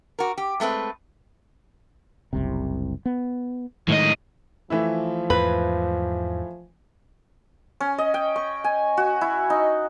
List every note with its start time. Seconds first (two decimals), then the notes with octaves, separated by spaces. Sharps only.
0.19 F#4 A#4
0.37 G4
0.60 G#3 A3 C4 B4
2.33 F#1 C2 C3
3.05 B3
3.88 A2 D#3 G#3 D#5
4.70 E3 F3 A3 E4
5.30 E2 G#2 B4
7.80 C#4
7.98 D#5
8.14 G5
8.36 C#6
8.64 G#5
8.97 F#4
9.21 E4
9.50 D#4